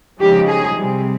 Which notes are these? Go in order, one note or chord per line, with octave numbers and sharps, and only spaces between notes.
C#3 F3 G#3 D#4 G4
G#4
C3 G3 C4